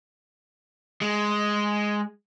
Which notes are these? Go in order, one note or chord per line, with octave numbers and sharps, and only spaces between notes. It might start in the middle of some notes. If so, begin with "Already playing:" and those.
G#3